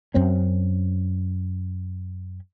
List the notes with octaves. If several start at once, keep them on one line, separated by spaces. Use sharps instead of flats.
F#2 C4 C#4